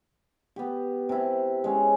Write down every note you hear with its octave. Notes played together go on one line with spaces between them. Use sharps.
B3 G4
C3 E4
G#3 C#4